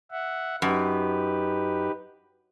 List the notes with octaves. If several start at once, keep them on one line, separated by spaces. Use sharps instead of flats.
E5 F#5
F#2 D#4 G4 B4